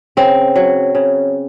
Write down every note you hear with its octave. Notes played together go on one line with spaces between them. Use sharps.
C#3 C4
F#3
C#3